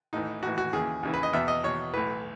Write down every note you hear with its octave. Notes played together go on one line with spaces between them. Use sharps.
A1 A2 E3 D#4
A1 A2 E3 F#4
F#4
D#2 C#3 E3 G#4
D#2 C#3 E3
B4
D#5
E2 B2 E5
D#5
E2 B2 C#5
B1 A2 E3 B4